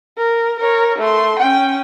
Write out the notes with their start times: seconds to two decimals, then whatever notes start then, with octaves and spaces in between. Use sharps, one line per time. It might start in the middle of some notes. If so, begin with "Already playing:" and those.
0.18 A#4
0.60 A#4 C#5
0.99 A3 C6
1.39 C#4 G5